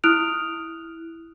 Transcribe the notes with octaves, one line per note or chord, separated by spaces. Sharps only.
E4 D#6 F6 F#6 D7 F7